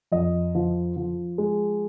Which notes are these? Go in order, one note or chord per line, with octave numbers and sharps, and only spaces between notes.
F2 D#5
F3
F3
G#3